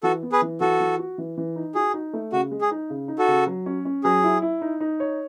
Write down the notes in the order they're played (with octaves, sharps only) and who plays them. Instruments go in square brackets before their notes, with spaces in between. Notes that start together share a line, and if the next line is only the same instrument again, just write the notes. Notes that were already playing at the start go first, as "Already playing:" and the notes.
[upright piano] E3 [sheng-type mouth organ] F#4 A4
[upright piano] B3
[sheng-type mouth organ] G#4 B4
[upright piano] E3
[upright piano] E3 [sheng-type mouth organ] F#4 A4
[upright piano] E3
F#4
E3
E3
D#4
[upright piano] F#4 [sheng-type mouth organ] G#4
[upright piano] D#4
A3
[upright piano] C#3 [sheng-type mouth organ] F#4
[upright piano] G#3
[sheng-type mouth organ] G#4
[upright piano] D#4
C#3
D#4
[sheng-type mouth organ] F#4 A4
[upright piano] C#3
F#3
C#4
C#4
[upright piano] F#3 [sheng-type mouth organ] G#4
[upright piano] E4
E4
D#4
D#4
C#5